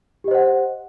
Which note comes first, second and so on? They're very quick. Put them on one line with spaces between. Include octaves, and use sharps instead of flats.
G4 D#5 C5 F#5